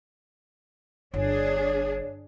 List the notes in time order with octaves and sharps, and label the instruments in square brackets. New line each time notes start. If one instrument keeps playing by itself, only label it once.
[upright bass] G1 [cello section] D4 G#4 [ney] C#5